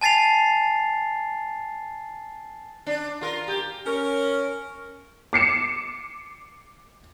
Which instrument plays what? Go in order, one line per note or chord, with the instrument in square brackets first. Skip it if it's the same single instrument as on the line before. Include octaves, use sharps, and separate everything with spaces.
[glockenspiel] G#5 A5 A6 C7 F7
[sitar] D4
F4 A#4
G4
[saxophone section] C#4 A#4
[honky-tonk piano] D6 C7 C#7 E7